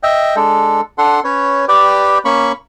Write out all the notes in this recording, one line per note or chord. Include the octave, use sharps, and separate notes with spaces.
D#5 E5 G5
G#3 D4 A4
D4 A4 F#5 C6
C#4 B4 C#5
G4 B4 D5 G5
A#3 C#4 B5 C#6